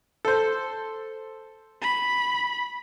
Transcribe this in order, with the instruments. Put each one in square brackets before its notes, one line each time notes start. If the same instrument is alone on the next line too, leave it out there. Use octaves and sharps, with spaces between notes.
[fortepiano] A4 C5
[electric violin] B5